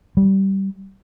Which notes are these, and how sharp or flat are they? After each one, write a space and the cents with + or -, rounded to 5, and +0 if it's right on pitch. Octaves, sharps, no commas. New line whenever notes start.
G3 -15